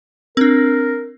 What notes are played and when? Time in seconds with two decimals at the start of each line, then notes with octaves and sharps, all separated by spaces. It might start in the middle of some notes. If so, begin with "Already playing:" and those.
0.37 C4 D4 A#4